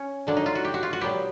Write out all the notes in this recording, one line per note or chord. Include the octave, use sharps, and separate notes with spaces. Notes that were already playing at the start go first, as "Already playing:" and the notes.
Already playing: C#4
D3 F#3 A#3 D4
D#4
F4
F#4
G4
F#4
F4
F#4
A#2 F#3 B3 G4